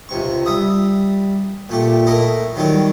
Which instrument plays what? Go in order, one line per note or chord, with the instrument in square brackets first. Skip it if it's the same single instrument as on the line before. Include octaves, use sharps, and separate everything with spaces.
[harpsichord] C#2 C3 C#6
G3 E5 D#6
A#2 A3 G4
A3 E4 A#4 D#5
D#3 F#3 G3 A#4